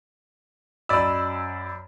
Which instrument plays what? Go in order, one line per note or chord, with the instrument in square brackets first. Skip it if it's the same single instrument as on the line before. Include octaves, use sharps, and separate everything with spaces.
[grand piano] F#2 D5 D#5 B5 E6